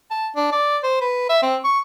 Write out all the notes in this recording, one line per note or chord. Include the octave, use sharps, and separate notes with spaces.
A5
D4
D5
C5
B4
E5
C4
C#6